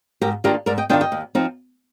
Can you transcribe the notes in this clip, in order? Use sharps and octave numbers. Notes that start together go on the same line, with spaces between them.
G#2 G4 A#4
D#3 A#3 D4 F4 G4 A#4
G#2 A#4 D5
D#5 G5
D#3 A#3 D4 F4 D#5 G5
D#5 G5
D#2
F3 C4 D#4